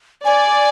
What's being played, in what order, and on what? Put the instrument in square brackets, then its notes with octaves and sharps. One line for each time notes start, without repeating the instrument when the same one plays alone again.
[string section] D5 [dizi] G#5